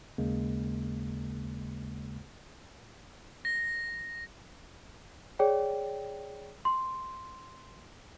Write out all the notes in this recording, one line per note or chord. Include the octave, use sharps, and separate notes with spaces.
D#2 C#3 G#3 A#3
A#6
G#4 C#5 D5 G5
C6